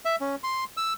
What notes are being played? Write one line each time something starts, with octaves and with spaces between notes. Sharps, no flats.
E5
C#4
C6
E6